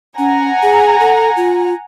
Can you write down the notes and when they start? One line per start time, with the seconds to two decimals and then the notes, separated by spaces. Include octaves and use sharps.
0.18 C#4 F#5 G#5 A#5
0.63 G#4
1.00 A4
1.37 F4